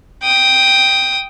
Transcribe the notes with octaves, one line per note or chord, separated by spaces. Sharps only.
G5 D#6